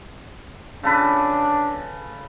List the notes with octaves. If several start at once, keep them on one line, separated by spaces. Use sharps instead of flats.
C#3 D4 A4 B4